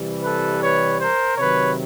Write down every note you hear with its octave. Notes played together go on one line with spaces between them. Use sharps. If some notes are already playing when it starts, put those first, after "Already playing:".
Already playing: C3 E3 G3
A4 B4
B4 C#5
A#4 C5
C3 D#3 F#3 B4 C#5